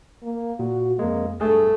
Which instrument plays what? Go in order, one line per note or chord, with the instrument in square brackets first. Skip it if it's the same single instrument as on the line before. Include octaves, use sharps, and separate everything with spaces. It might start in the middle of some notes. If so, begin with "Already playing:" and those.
[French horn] A#3
[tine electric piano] A#2 [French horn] F#4
[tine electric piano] F2 G#3 [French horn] A#3
[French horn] G2 [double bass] A3 [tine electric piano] G#4